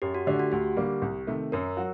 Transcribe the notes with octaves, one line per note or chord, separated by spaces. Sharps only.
F#2 G4
F#4
D3 A3 D4 G4
F#4
D2 G4
D3 G3 A#3
C2
C3 D#3 A3
F#2 A#4
F#3 F#4